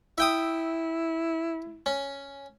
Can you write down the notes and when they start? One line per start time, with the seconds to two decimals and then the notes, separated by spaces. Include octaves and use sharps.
0.18 E4 E5 G5 D#6
1.86 C#4